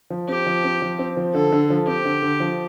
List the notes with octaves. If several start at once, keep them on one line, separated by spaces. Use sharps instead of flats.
F3
C4 G4
F3
C4
F3
C4
F3
D3 A4
D3
F3
C4 G4
D3
D3
F3